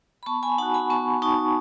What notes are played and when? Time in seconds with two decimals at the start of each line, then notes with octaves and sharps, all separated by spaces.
0.23 B5
0.26 B3 A5 C#6
0.43 G#5 B5
0.58 D#4 F#5 A5
0.62 F#4
0.74 G#5 B5
0.90 B3 A5 C#6
1.22 D#4 F#4 A5 C#6